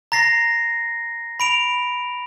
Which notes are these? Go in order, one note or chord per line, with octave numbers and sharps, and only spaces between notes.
A#5 A6 A#6 C7
B5 D7 F7